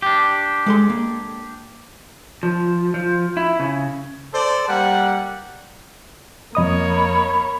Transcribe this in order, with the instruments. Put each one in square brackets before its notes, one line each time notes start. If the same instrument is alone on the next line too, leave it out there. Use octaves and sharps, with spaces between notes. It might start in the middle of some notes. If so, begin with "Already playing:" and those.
[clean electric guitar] D4 G4
[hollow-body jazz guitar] G#3 A4 C6
A#3
[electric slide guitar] F3
F3
E4
C#3
[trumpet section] A4 C5 D5
G3 A#3 F#5
[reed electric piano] F2 D#5 D#6 [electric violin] A#3 C#5 [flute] B5